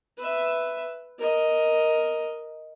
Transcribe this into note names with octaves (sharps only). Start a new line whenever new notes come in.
B4 E5
A#4 D#5